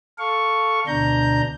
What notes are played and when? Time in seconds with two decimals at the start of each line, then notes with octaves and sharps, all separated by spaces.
0.18 A4 F5 C#6
0.87 D2 B2 D4 A#5 G6